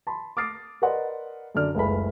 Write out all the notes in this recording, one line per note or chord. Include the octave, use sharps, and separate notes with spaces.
A5 B5 C6
D6 D#6 F6 A6 C7 D7
A#4 B4 D5 D#5 F#5 C6
F#2 D3 D5 F6
F#1 C#2 A3 G#4 B4 B5